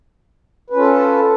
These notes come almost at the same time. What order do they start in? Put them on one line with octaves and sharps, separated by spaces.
B4 C#4 F4 A4